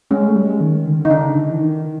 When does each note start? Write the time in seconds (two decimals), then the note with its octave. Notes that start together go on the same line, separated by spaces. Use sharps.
0.10 G#3 C#4
0.27 A3
0.35 G3
0.44 G#3
0.61 D#3
0.86 D3
0.93 D#3
0.99 D3
1.05 D#4
1.10 C#3 D4
1.35 D3
1.50 E3
1.60 D#3
1.85 D#3